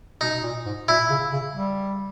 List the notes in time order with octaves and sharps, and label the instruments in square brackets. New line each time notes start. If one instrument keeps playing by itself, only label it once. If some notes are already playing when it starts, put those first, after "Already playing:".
[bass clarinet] B2 [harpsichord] D#4
[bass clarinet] A#2
G#2
[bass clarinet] A#2 [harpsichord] E4
[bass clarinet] C#3
C#3
G3